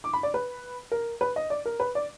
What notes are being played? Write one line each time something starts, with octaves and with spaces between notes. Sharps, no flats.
D6
B5
D5
B4
A#4
B4
D#5
D5
A#4
B4
D5